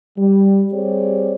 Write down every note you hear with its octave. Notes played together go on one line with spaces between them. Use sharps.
G3
G3 C4 G4 G#4 C#5 D5